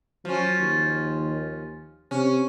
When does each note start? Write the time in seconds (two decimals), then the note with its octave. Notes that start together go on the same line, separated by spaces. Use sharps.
0.25 F3 F#3 C#4
0.60 D#2
2.11 C3 C#4